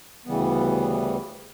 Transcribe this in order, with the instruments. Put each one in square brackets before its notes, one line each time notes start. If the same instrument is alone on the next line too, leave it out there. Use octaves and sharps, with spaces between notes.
[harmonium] D2 C#3 E3 G3 B3